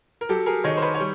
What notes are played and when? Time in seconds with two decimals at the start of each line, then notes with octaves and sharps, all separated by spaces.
0.21 A#4
0.29 F#3 G4 A4
0.46 G#4 A#4
0.64 D#3 C#5 D#5
0.77 C5
0.82 B4 C#5
0.94 C#5
1.00 G3